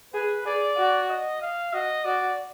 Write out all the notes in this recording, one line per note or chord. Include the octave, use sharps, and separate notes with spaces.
G#4 B4
G#4 D5
F#4
D#5
F5
F#4 D#5
F#4 D5